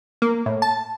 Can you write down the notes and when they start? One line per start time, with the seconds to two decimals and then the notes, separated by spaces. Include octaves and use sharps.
0.22 A#3
0.46 A2
0.62 A5